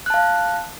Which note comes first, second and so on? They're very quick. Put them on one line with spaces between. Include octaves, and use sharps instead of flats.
F#6 A5 F5